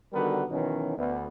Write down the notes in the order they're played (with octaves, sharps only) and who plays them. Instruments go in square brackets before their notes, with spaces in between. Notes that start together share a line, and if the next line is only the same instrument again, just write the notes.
[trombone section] D3 D#3 G3 B3 F#4 A#4
B2 D#3 E3 F#3 C#4
D2 B3